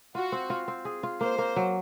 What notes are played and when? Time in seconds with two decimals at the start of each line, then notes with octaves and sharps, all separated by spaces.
0.14 F4 F#4
0.32 C4
0.50 F4
0.68 C4
0.85 G#4
1.03 F4
1.21 A#3 C5
1.38 A#3
1.56 F#3